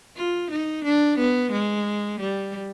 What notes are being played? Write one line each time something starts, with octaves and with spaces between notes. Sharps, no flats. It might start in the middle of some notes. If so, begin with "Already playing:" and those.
F4
D#4
D4
B3
G#3
G3